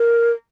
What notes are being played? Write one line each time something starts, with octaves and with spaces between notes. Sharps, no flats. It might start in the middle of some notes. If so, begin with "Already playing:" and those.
Already playing: A#4